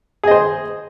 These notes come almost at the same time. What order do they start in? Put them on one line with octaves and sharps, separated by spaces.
G#4 D#5 C5